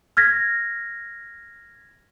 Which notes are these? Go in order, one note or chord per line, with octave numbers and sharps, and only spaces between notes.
F6 G#6 A#6 B6